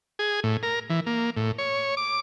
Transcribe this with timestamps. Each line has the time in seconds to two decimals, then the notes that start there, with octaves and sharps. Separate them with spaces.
0.19 G#4
0.43 A2
0.63 A#4
0.90 E3
1.06 A#3
1.36 A2
1.58 C#5
1.97 D6